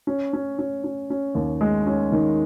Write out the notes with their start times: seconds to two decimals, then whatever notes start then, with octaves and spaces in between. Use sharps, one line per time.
0.07 C#4
0.33 C#4
0.59 C#4
0.84 C#4
1.10 C#4
1.35 D#2
1.61 G#3
1.87 C#4
2.12 D#3